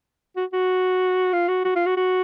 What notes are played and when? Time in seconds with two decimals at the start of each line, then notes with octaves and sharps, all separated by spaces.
0.37 F#4
0.53 F#4
1.33 F4
1.48 F#4
1.65 F#4
1.75 F4
1.86 F#4
1.97 F#4